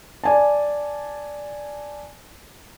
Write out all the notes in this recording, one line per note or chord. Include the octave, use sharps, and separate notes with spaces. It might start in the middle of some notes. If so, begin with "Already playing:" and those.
D5 G#5 A5